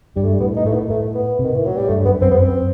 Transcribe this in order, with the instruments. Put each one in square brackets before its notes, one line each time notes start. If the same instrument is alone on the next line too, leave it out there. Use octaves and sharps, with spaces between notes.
[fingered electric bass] G2 [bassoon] G3
[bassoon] A3
G3
[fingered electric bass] A2 [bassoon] B3
[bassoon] D#4
[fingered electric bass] A2 [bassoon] A3
[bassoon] B3
[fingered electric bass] A2 [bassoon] A3
[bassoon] B3
[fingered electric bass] C3 [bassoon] D#3
[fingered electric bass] A2 [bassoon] E3
[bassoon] F#3
G3
[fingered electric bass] G2 [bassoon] A3
[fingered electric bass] F#2 [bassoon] B3
[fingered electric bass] F#2 [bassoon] C4
[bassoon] B3
[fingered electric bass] F#2 [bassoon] C4